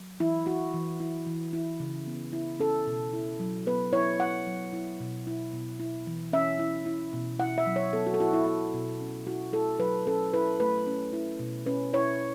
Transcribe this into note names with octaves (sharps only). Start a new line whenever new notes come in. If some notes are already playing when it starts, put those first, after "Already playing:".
Already playing: F#3
E3 E4
E4 F#4
E3
E4
E3
E4
C#3
B3
E4
C#4 A4
B2
E4
F#3
B3 B4
E4 C#5
E4 F#5
F#3
E4
B2
E4
B2
E4
E3
C#4 E5
E4
E4
B2
E4 F#5
E5
F#3
C#5
B3 A4
F#4
A4
E4 F#4
E4
E4
B2
C#4
E4 F#4
E4 A4
F#3 B4
C#4 A4
E4 B4
A3 B4
C#4
E4
B2
C#4 B4
E4 C#5